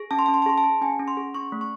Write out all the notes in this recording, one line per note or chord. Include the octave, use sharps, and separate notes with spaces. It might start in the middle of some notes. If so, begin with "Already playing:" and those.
Already playing: G#4
C#4 A5
C6
C#4 A5
C6
A5
G#4 C6
A5
G#4
C#4 G#5
C#4
C6
G#4
C#4 C#6
A3
C#6